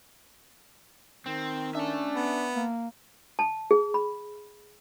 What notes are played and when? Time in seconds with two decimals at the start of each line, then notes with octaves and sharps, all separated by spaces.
1.26 D#3 C4
1.75 C#4 D4 E5 A5
2.15 B3
2.56 A#3
3.39 A5
3.71 G#4
3.94 B5